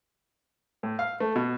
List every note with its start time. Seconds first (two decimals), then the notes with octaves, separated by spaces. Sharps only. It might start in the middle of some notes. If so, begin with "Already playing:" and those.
0.83 A2
0.99 F5
1.20 A3
1.36 B2